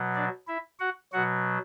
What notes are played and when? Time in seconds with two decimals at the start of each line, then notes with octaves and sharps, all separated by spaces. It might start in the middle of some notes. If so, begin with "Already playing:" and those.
Already playing: B2 F#3
0.15 D4 D5
0.47 E4 E5
0.80 F#4 F#5
1.13 B2 F#3 F#4 F#5